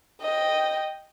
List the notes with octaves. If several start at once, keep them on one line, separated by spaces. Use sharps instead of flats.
D#5 G5